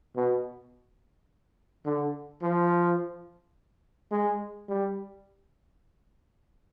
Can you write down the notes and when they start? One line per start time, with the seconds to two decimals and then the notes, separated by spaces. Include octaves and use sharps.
0.16 B2
1.85 D3
2.42 F3
4.11 G#3
4.69 G3